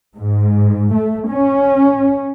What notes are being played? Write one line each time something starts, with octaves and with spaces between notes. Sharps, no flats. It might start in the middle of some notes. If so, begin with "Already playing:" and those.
G#2
A3
C#4